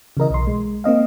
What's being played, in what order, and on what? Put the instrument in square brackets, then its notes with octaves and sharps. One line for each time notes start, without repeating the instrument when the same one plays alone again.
[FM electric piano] C#3 E3 A#4 D#5
B1 C6
G#3
A#3 C4 D#5 F5